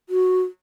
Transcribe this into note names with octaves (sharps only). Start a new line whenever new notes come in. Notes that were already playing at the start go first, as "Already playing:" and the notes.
F#4